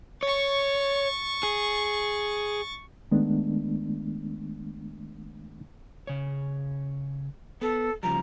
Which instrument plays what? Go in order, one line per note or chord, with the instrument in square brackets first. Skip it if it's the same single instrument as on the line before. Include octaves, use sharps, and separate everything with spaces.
[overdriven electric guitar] C#5 [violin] C#6 A6
[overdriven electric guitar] G#4
[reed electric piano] D#3 G#3 A3 B3 D4
[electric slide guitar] C#3 C#5
[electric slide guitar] B3 [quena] A4
[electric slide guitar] C#3 F3 G3 [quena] A#5